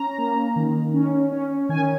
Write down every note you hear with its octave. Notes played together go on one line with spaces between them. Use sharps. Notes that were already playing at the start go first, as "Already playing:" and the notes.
Already playing: C#4 A#5
A#3
D#3
C#4
C#4
D#3 G#5